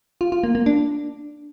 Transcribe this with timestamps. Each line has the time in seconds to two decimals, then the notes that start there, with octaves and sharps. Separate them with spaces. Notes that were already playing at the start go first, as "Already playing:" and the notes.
0.21 F4
0.32 F4
0.44 A#3
0.55 A#3
0.66 D4